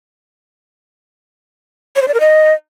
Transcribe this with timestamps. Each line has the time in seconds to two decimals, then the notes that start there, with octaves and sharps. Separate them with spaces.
1.96 C#5
2.02 C5
2.08 D5
2.14 A#4
2.20 D#5